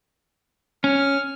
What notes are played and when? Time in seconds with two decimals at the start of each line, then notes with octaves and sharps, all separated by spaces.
0.84 C#4 F6